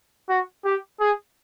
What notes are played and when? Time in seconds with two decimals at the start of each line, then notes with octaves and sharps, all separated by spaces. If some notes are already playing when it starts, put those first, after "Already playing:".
0.29 F#4
0.64 G4
1.00 G#4